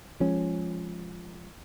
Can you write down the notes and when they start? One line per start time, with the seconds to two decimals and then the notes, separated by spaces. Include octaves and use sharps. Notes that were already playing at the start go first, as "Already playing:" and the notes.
0.20 F3 G#3 C#4